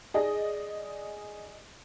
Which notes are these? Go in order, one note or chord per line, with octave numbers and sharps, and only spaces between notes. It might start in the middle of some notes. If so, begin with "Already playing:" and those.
G#4 D5 D#5